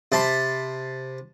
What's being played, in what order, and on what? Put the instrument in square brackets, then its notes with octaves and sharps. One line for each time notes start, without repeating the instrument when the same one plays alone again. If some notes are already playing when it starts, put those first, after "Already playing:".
[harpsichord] C3 A5 B5 C6